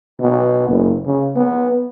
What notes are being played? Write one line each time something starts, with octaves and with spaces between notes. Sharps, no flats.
B2
F#1
C#3
B3